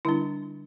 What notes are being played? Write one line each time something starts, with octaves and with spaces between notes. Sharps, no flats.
D3 G3 D4 E4